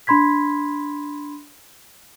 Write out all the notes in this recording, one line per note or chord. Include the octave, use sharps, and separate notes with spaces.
D4 B5 C6 G#6 B6